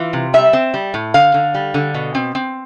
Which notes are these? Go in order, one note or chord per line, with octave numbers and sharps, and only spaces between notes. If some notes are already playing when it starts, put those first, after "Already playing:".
Already playing: E3 F4
C3
G3 E5
C4
G3
A2
D3 F5
D3
G3
D3
B2
C4
C4